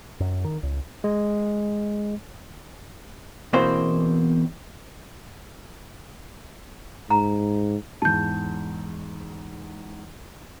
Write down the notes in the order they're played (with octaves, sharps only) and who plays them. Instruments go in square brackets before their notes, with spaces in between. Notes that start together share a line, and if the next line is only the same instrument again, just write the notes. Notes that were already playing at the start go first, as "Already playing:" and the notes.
[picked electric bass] F#2
D#3
C#2
[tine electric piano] G#3
[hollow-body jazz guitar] E2 B2 E3 A#3 C4 C5
[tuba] G#2 [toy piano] A#5
[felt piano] E2 G#2 [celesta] A5 G6